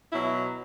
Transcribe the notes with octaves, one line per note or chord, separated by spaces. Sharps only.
B2 F#3 E4